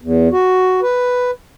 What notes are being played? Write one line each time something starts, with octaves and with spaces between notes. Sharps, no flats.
E2
F#4
B4